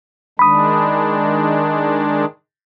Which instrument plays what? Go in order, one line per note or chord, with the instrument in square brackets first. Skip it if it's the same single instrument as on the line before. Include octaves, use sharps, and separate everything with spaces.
[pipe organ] D#3 G#3 D4 [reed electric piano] B5 D#6